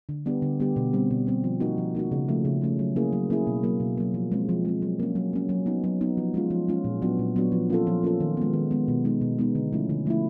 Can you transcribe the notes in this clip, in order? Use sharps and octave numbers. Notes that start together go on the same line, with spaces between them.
D3
G3 B3 D4 G4
D3
G3 B3 D4 G4
B2
G3 C4
B2
G3 C4
F3
A#3 D#4 F#4
F3
A#3 D#4 F#4
C#3
F3 A3 C#4
C#3
F3 A3 C#4
F#3
A#3 C#4 E4 G#4
F#3
A#3 C#4 E4 G#4
B2
F#3 A#3
B2
F#3 A#3
F3
G#3 C4
F3
G#3 C4
F#3
A#3 C#4
F#3
A#3 C#4
F#3
B3 D#4
F#3
B3 D#4
F3
G#3 C#4 F4
F3
G#3 C#4 F4
A#2
F#3 B3 D4 F#4
A#2
F#3 B3 D4 F#4
F3
A#3 C#4 F4 A4
F3
A#3 C#4 F4 A4
D#3
G#3 B3
D#3
G#3 B3
B2
G#3 B3 D#4
B2
G#3 B3 D#4
D3
F3 A3 C#4 E4
D3
F3 A3 C#4 E4